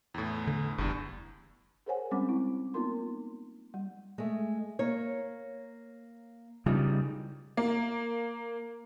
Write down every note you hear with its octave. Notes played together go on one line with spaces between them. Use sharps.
E2 A2
D3
F#1 E2 G2
G#4 A#4 C5 C#5 F#5 G#5
G3 G#3 C4 C#4 D6
E4
A#3 B3 D#4 F4 A#4 C6
G3
G#3 A3
A#3 C#5
C#3 G3 D#4 F4
A#3